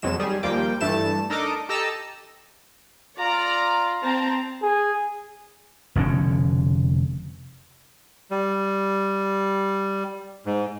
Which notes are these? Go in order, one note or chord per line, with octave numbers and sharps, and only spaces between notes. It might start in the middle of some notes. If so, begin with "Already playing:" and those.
F2 B2 F#3 G#3 E7
D#3 G3 G#4
D#2 F3 G3 A#3 G5 D6
G2 E3 A3 A5 E7
D4 D#4 A4 A#4 D#5 D6
G4 A4 D#5 A5 A#5 E6
F4 D5 A#5 D6
C4 A5 A#5
G#4
F1 B2 D3 C#4
G3
G#2